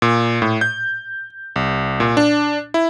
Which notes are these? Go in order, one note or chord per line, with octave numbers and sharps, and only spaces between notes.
A#2
A2
G6
C2
A#2
D4
E4